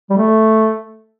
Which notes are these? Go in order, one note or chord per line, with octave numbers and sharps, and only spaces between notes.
G3
A3